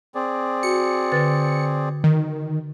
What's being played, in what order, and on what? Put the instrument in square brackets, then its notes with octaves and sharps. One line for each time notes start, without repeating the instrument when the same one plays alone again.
[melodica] C4 G#4 D5
[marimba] F#4 [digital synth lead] C#7
[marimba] D3 B4 A6
[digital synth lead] D#3